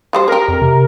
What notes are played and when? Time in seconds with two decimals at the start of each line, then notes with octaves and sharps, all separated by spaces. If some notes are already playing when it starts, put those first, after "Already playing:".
0.13 F#3 G3 C5
0.28 G4 G#4 A#4
0.48 F2
0.62 C3